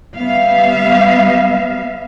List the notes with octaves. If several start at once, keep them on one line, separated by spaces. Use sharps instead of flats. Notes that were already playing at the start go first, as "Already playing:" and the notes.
G3 B3 E5 F5